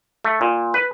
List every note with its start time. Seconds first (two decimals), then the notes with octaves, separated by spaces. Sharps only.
0.25 A3
0.41 A#2
0.74 B4